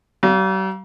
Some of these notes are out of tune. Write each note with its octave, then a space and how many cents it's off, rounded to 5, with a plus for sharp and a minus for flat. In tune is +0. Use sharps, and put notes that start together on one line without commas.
G3 -45 F5 +0